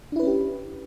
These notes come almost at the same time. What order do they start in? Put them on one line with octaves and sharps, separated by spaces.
D4 E4 B4 C#4 G4